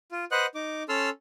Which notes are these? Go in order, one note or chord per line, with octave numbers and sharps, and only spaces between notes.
F4
B4 C5 D#5 F#5 F#6
D#4 D6
C#4 A4 C6 E6 F6